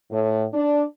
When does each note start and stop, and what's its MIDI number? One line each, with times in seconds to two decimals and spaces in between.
0.11 0.44 45
0.53 0.82 62